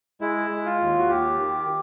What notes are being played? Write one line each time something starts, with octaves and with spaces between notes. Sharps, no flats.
G#3 E4
G#3
F4
D#2
F#4
D#2 G4
D#3